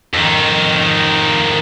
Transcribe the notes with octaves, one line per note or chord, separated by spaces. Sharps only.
F2 D#3